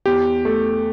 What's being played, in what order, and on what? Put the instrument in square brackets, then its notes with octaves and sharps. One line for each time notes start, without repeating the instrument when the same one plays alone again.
[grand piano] E2 [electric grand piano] G4
[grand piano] A3